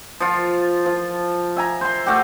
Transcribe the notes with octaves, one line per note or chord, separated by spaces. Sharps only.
F3 F4
F3
E5 G#5 A#5
C5 C6
A3 F#4 G4